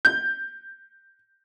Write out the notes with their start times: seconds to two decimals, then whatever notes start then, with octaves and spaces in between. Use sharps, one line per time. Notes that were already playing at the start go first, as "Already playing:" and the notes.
0.05 G6